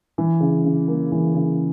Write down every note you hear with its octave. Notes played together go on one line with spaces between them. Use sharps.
E3
C#3
C#3
A#3
E3
C#3